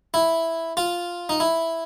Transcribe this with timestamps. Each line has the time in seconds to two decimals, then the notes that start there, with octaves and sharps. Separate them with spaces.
0.14 E4
0.77 F4
1.29 D#4
1.40 E4